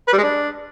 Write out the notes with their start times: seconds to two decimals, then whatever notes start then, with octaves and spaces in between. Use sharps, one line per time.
0.08 B4
0.13 G3
0.18 G#3
0.23 D4